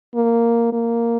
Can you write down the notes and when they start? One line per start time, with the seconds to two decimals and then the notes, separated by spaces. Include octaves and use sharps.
0.14 A#3
0.72 A#3